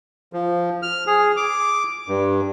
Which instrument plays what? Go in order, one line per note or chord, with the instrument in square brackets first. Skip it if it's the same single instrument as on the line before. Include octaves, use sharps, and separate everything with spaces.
[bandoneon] F3
F6
G#4
D6
G2